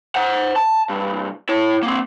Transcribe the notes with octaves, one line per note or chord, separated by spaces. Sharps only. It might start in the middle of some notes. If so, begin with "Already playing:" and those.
C5 F#5
A5
C2 G2
E4 C#5
A#3 C4